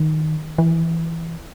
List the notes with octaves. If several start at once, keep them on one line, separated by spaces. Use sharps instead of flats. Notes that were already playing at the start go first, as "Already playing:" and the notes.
Already playing: D#3
E3